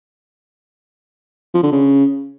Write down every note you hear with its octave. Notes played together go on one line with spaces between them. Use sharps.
F3
D3
C#3